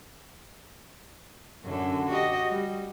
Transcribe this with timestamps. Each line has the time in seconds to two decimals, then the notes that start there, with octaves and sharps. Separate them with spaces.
1.63 F#2 D3
2.09 F#4 G4 D#5
2.49 G3